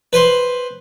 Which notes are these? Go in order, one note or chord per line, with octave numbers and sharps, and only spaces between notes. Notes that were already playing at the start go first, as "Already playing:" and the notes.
B4 C5